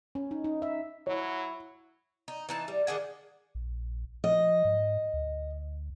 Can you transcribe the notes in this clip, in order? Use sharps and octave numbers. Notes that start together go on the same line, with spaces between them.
C#4
D#4
D#4
E5
F#3 E4 C#5
D#4
E3 D#4 A5
G3
D#3 D4 G#4 F#5
A#1
F3 D#5
G#2
D2